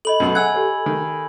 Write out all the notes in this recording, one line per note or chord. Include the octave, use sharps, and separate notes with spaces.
A4 C#5 D#5 B5 F#7
F#2 B2
F#5 G#5 E6 F#6 G#6
G4 A4 C#5
D#3